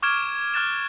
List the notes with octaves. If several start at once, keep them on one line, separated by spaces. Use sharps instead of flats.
C#6 D6 F6 G#6 D7 E7
D6 F6 F#6 A6 E7